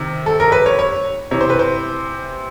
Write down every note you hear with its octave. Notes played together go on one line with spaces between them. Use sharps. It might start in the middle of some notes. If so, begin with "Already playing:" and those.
Already playing: C3 D#3
A4
A#4
B4
C#5
C#5
C3 E3 C#5
C5
B4
C5